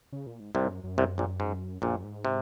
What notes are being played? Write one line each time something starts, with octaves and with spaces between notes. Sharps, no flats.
C#3
A#2
G#2
C2 G#2 C3
F#2
F#2
C2 C3
A#1 A#2
G#2
A#1 F#2 A#2
G#2
C3